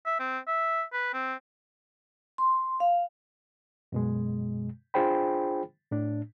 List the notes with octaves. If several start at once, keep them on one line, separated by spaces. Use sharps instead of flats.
E5
C4
E5
B4
C4
C6
F5
F#2 B2 G#3
D4 F4 G#4 C5 G5 B5
A2 D4